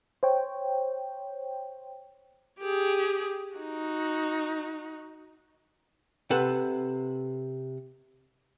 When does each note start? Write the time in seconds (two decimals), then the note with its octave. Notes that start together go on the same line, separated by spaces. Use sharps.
0.23 C5 C#5 G5
2.60 G4 G#4
3.55 D#4 F#4
6.30 C3 A4 B4 F#5